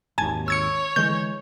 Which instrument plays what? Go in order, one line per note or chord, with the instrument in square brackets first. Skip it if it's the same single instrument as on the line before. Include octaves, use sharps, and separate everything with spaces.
[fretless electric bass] G#1 D#2 [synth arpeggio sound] G#5 A5 G#6
[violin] C#5 [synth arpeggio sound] E6 G#6 C#7
[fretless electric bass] D3 E3 G#3 [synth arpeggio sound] G6